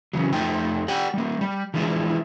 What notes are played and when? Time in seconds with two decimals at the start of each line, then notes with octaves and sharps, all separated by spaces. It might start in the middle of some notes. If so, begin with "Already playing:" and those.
0.13 C#3 E3 F#3
0.32 F2 F3 A3 D#4 G5
0.88 G4 D5 F#5 G5
1.14 G3 A#3
1.41 G3
1.74 E3 F3 G#3 D4 E4